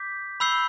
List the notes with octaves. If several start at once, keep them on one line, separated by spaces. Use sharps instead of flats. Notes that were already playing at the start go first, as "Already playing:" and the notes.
Already playing: D6 G6 B6
B5 E6 G6 C7 G7